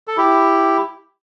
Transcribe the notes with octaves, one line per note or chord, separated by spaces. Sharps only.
A4
E4 G4